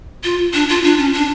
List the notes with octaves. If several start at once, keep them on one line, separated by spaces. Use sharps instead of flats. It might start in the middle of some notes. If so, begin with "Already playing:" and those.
F4
D4
F4
D4
C#4
D4